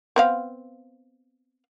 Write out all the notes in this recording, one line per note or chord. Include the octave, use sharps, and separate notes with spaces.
B3 C4 F5